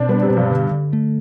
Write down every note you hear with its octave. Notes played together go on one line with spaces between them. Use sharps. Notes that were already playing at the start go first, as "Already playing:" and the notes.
Already playing: B2 C4 D4
G3 B3
C3
B2
G2
D3
D3
A3